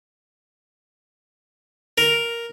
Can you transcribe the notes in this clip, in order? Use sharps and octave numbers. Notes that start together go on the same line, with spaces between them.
A#4